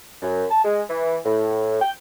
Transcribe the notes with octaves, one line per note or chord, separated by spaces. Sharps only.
F#2
A5
G#3
E3
A2
G5